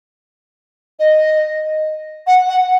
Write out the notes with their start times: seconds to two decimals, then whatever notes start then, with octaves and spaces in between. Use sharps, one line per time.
0.99 D#5
2.27 F#5
2.49 F#5